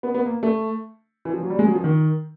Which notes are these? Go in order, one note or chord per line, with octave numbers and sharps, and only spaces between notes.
B3
B3
A#3
A3
E3
F3
F#3
G3
G#3
F#3
F3
D#3